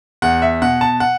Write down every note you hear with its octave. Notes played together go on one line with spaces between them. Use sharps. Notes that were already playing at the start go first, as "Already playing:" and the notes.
E2 F#5
E5
B2 F#5
A5
F#5